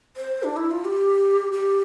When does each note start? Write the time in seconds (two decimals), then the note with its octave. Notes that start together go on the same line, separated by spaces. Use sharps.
0.17 C5
0.43 D4
0.56 E4
0.71 F4
0.85 G4
1.52 G4